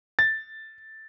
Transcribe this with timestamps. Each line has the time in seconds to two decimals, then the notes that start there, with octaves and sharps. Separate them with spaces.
0.19 A6